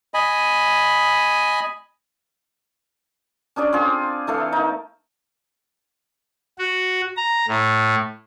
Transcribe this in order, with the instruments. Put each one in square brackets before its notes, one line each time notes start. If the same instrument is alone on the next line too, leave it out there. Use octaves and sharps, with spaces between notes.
[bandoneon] D#5 G#5 B5
[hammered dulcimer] C#4 D4 G#4 D5
C4 F4 G#4 A4
E3 A3 A4 F5
A#3 D#4
[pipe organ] F#4
A#5
A2